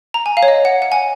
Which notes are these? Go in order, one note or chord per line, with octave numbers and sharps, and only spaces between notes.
A#5
G#5
F5
C#5
D#5
F#5
F#5
G#5